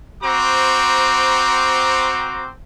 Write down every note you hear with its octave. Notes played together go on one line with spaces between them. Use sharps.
C4 F#4 C5 A#5 D6